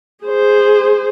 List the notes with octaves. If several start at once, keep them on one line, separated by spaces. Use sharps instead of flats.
G#4 C5